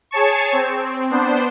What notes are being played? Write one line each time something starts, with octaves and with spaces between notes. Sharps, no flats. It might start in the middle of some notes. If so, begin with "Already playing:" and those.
G#4 C#5 A5 C#6
C4
B3 D4 C5